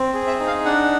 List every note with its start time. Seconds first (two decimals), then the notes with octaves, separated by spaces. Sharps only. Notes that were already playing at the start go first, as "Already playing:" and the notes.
Already playing: C4
0.14 G#4
0.27 E5
0.40 D#4
0.47 F5
0.65 D4 F#5